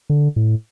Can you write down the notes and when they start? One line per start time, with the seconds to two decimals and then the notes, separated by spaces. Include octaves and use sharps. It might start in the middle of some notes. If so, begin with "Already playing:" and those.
0.10 D3
0.36 A2